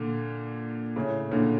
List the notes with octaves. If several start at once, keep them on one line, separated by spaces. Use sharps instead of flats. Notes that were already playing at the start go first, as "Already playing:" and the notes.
Already playing: A#2 D3
A2 C#3
A#2 D3